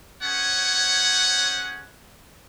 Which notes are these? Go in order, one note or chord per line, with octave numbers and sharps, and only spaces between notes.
C#4 G#4 C5 C#5 F#5